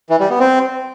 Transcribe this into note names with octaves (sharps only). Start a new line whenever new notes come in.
E3
G3
B3
C4